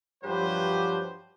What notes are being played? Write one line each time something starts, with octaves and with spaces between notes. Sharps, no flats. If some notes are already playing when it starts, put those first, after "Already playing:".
G2 F3 F#3 G4 B4 C5